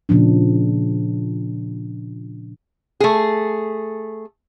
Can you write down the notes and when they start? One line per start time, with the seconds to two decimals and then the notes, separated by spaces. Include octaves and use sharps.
0.09 A#2 C#3 F3 D4
3.00 A3 G#4